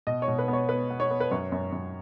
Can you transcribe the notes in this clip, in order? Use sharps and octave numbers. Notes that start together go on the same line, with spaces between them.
B2 D#5
C#5
B2
B4
B3
C#5
B3 B4
B3
C#5
B3
B4
F#2 C#5
F#2
F#2